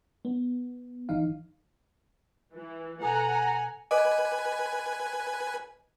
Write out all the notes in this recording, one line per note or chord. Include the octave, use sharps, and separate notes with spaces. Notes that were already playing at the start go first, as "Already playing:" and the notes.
B3
G1 E3 D#4 F5
E3
B2 A4 F#5 G#5 A#5
B4 D#5 G#5 D6